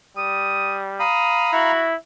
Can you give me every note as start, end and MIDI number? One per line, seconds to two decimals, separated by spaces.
0.17 1.04 55
0.17 0.77 87
1.00 1.72 77
1.00 1.72 82
1.00 1.72 83
1.00 1.51 87
1.53 1.95 64
1.53 1.86 66